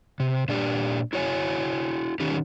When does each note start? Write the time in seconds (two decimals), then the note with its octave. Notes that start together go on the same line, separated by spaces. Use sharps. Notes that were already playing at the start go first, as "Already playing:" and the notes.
0.20 C3
0.48 A#2 D4 G4
1.13 E4 F#4 C#5 F#5 G#5
2.20 D#3 C#4 D#4 G4